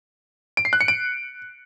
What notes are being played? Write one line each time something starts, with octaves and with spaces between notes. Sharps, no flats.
D7
C7
F#6
C#7
D7